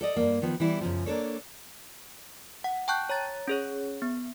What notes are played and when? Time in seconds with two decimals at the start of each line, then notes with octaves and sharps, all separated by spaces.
0.01 A4 D5 D#5
0.16 G2 A#3
0.42 D#3 F3 B3
0.60 E3 G3 E4
0.81 F#2 C#3 F3
1.06 A#3 D4 A4 C#5
2.64 F#5
2.88 G5 A5 C#6 F#6 G6
3.09 C#5 A#5 A6
3.48 C#4 G#4 C#5
4.02 B3